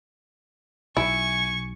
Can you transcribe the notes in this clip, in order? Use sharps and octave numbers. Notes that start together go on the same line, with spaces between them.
B1 E4 G#5 C#6